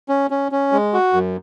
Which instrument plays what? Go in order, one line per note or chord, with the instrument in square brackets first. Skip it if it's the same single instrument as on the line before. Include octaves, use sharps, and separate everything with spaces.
[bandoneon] C#4
C#4
C#4
G#3
F#4
F#2